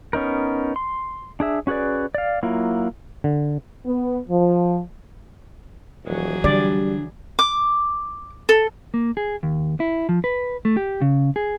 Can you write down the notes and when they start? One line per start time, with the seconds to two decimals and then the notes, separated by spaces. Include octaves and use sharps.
0.13 B3 C#4 D#4 A#4
0.76 C6
1.40 D4 G#4 E5
1.67 C#4 F#4 G#4 B4 D5
2.15 D5 F5
2.43 F#3 A#3 E4 F4
3.24 D3
3.86 B3
4.29 F3
6.05 D#1 E3 F#3 G#4
6.44 D3 G3 D5
7.39 D6
8.49 A4
8.94 A#3
9.17 G#4
9.43 D#2
9.80 E4
10.09 F3
10.24 B4
10.65 A3
10.77 G4
11.01 C#3
11.36 G#4